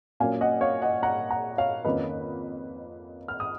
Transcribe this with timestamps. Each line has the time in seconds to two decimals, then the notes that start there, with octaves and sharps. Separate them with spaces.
0.20 A#2 F#3 A#3 C#4 F5 G#5
0.41 D#5 F#5
0.61 C#5 F5
0.82 D#5 F#5
1.03 F#5 A#5
1.30 F#5 A#5
1.58 C#5 F5
1.85 F2 D#3 A#3 C#4 B4 D#5
3.28 F6
3.40 D#6